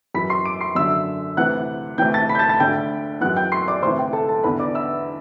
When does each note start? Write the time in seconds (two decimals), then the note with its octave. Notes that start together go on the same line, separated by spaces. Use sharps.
0.15 F#2 E3 B5 B6
0.30 C6 C7
0.45 D6 D7
0.61 C6 C7
0.75 F#2 D3 E5 E6
1.37 D2 C3 E3 F#5 F#6
1.98 D2 C3 E3 G5 G6
2.14 A5 A6
2.29 B5 B6
2.35 G6
2.39 A5 A6
2.49 A5 A6
2.60 D2 D3 G5 G6
3.21 E3 F#5 F#6
3.25 F#2
3.36 G5 G6
3.52 C6 C7
3.68 D5 D6
3.82 D2 C3 E3 C5 C6
3.99 G5
4.13 A4 A5
4.29 A4 A5
4.43 E2 D3 B4 B5
4.59 D5 D6
4.74 E5 E6